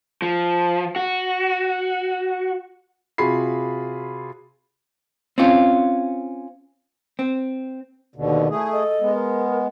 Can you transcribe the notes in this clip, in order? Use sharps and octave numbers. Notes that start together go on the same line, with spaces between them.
F3
F#4
C3 F4 F#4 G#4 B5 C7
C4 C#4 F4
C4
D#2 B2 D3
A3 E4 G#4
A4 D#5
G#3 B3
A#4